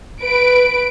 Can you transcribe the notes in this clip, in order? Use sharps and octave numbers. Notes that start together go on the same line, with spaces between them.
B4 D7